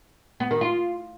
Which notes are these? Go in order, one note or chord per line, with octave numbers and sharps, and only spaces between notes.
B3
D#3
F4